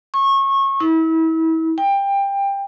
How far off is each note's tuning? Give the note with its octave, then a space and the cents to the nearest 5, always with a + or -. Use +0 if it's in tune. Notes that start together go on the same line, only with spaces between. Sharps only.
C#6 -25
E4 -35
G5 +20